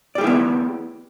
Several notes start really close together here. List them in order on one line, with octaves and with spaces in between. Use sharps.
D5 G4 G#4 E4 B3